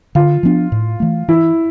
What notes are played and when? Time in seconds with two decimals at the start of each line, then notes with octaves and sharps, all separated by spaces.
0.15 D3 F4
0.43 F3 B3 D4
0.72 A2
1.00 E3 A3
1.28 E3 E4